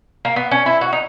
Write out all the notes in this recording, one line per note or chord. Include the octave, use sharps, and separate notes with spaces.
A#3
B3
C#4
E4
F#4
D#4